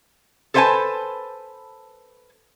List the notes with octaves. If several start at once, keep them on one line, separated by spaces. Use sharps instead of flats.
A4 B4 C5 F#5 G#5 A5